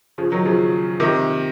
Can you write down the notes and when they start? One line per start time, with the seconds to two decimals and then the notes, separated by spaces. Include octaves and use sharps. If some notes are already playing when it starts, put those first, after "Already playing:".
0.18 C#3 F3
0.32 D#3 F#3
0.45 C#3 F3
1.00 C3 D#3